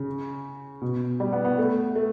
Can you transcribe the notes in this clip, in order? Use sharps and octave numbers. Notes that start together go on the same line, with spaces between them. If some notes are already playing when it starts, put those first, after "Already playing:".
Already playing: C#3
B2
G3
B3
B3
A3
A3